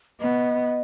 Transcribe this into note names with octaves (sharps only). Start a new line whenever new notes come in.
B3 D#5